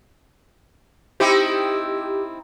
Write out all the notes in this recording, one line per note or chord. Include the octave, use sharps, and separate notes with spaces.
C4 D#4 E4 G4